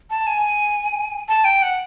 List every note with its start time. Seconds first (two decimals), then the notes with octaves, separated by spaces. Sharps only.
0.10 A5
0.27 G#5
1.28 A5
1.44 G5
1.63 F#5